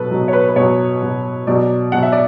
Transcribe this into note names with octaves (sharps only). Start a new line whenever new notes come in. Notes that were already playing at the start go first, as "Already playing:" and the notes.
Already playing: B2 F#3 A4 B4
B2 F#3
C#5
B4
B4
B2 F#3 C#5
B2 F#3
B2 F#3 D5
B2 F#3 F#5
E5
D5